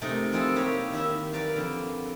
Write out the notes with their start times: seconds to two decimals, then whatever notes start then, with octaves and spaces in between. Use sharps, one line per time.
0.02 C3 A3 D#4 A#4
0.32 F3 C4 D#4 E4 G#4 A4
0.56 A#3 G4 C#5 A#5
0.92 D#3 E4 E5 B5
1.33 A#4 B4 D5 F5
1.56 F2 D3